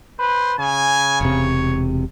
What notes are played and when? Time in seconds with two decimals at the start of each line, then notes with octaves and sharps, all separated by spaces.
0.19 B4 C5
0.59 C#3 G#5
1.21 E1 C3 C#5